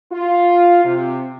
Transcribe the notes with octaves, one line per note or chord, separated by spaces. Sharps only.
F4
C3